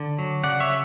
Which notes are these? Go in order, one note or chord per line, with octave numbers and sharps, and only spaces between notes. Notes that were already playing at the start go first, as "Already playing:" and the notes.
Already playing: D3 D5
F#3
C#3 D5 F#5
C#5 E5
F#3